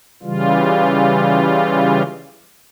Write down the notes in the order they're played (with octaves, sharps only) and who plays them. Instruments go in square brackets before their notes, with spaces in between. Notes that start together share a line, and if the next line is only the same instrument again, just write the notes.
[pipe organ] C#3 E3 G3 F4